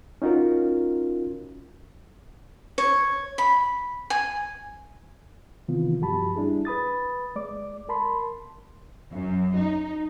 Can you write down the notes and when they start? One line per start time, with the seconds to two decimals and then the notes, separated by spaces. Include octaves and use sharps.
0.22 C#4 D#4 F4 F#4 A#4
2.78 C#5
3.38 B5
4.10 G#5
5.68 C3 D#3 E3 B3 F4
6.01 G2 F3 F#4 G4 A5 B5
6.36 G3 D4 E4 G#4
6.65 B4 B5 D#6 A6
7.36 G#3 D5 D6
7.89 A#4 A5 B5 C6
9.12 F#2
9.56 D#4